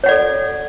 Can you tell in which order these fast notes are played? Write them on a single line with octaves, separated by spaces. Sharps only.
C#5 F#5 D5 A4